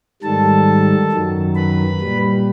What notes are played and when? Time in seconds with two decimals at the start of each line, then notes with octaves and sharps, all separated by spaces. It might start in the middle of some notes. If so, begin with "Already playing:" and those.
0.23 G#2 D#3 G3 A4 A5
1.12 F#2 D#3 F#3
1.56 B4 B5
2.00 A#2 G3